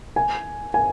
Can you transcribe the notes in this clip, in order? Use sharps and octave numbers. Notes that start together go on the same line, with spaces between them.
G#5
G#5